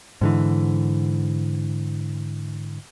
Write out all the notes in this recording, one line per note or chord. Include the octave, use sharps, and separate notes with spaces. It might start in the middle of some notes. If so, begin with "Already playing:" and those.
G#2 D3 E3